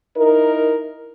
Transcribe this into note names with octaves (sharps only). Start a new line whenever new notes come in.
D#4 E4 A#4